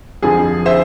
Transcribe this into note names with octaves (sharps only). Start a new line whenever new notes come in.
F2 D3 F3 G#4
C5 E5